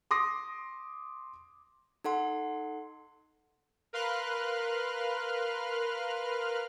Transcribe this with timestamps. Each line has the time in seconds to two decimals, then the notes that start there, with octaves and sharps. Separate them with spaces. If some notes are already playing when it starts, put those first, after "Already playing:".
0.11 C6 D6 D#6 A#6
2.04 D#4 A4 F#5 C6
3.93 A#4 B4 F5 C6 F6 F#6